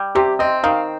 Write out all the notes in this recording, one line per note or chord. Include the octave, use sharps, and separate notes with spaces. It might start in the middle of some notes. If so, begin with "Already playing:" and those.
Already playing: G3
C3 G4
C4 D#5
D#3 F5